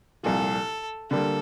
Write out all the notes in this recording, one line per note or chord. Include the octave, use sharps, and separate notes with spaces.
C2 A#2 F3 A4
D3 G3 A#3 A4